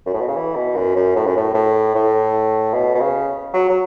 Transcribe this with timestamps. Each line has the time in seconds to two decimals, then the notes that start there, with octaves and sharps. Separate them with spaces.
0.06 F#2
0.14 A2
0.21 B2
0.28 C#3
0.36 E3
0.56 B2
0.76 F#2
0.96 F#2
1.16 A2
1.26 F#2
1.37 A2
1.54 A2
1.95 A2
2.74 B2
2.94 B2
3.00 C#3
3.54 F#3
3.69 F#3